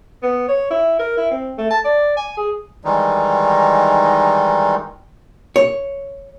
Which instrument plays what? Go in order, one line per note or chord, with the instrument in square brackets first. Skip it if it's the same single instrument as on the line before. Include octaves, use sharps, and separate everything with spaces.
[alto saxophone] B3
C#5
E4
A#4
E4
C4
A3
A5
D5
G#5
G#4
[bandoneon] D#3 E3 G3 G#3 D#4
[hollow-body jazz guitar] C#5